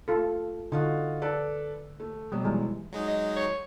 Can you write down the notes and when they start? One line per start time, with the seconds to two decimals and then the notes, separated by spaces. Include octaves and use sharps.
0.08 A3 F4 A4
0.72 D3 D#4 F4 F#4
1.22 A4 B4 D5
2.00 A3
2.32 B2 F#3 G3
2.44 E3 G#3
2.93 F#3 G#3 D#4
3.08 D#5
3.36 C#5